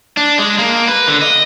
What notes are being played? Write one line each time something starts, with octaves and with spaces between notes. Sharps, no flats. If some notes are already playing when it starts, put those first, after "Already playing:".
D4
G#3
A#3
B4
D3
D#5